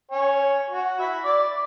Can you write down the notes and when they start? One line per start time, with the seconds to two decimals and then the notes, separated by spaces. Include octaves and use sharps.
0.11 C#5 G#5
0.70 F#4
1.00 E5 B5
1.25 D5 D6